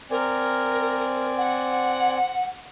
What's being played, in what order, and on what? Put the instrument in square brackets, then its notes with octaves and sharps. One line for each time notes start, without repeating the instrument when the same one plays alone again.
[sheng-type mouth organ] C4 D5 G#5 [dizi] A#4
[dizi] F#5